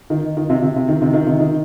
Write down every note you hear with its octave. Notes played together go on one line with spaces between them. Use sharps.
D#3
D#3
C3
C3
C3
D#3
C3
D#3
C3
D#3